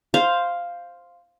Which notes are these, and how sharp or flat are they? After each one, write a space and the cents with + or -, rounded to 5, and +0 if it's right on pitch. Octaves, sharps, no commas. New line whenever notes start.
C5 +0 F5 +0